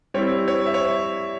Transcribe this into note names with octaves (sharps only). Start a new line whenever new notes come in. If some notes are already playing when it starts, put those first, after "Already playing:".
G3 C4 E4 C#5
C#5
E5
C#5